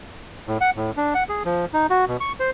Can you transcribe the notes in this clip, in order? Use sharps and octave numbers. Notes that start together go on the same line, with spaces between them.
A2
F#5
A2
D4
F#5
G#4
F3
D#4
F#4
B2
C#6
C5